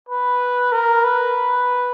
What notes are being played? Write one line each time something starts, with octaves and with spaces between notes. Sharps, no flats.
B4
A#4
B4